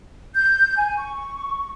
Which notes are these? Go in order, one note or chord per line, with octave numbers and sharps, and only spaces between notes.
G6
G#5
C#6